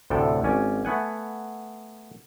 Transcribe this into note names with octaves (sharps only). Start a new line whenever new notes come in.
D2 A2 C3 A4 G5
G#1 C#4 D5 G#5
A3 B3 F#5 G#5